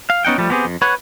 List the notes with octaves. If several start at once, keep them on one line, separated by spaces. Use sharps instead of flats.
F5
B3 C#4 D#4 F#5 G5
F3 G3 A3
B3 C4 G4 G#4
F2
B4 C#5 F#5